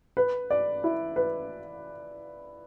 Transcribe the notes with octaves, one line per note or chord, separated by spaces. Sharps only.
B4
D5
E4
B4